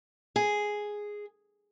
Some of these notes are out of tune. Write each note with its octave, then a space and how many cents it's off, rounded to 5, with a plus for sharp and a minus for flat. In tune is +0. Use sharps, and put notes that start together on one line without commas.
G#4 +0